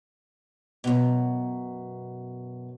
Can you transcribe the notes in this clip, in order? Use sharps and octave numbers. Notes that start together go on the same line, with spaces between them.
F#2 B2